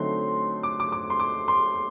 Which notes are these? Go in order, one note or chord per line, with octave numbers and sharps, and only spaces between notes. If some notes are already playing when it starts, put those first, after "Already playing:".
Already playing: D3 F#3 A3 C4 D#4 C6
D6
D6
D6
C6
D6
C6